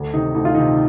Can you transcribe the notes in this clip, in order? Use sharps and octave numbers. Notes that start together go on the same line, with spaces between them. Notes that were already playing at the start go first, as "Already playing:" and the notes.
Already playing: D2
C3 D#3 D#4
D2 D#4
F4
C3 D#3 D#4